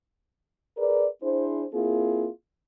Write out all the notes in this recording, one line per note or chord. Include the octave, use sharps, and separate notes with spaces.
G#4 A#4 B4 D5
D4 E4 G#4 C5
A#3 C4 E4 F4 G#4